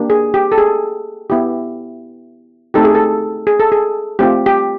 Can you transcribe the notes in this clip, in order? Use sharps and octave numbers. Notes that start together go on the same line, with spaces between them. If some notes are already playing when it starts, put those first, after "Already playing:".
Already playing: A#3 D4 G4
G#4
G4
A4
G#4
B3 E4 G4
A3 C4 D#4 G4 A4
G#4
A4
G#4
A4
G#4
A3 C4 F4 G4
G4